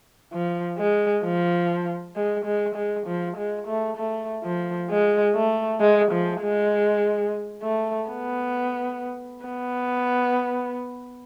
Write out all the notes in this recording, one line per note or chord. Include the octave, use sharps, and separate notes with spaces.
F3
G#3
F3
G#3
G#3
G#3
F3
G#3
A3
A3
F3
G#3
A3
G#3
F3
G#3
A3
B3
B3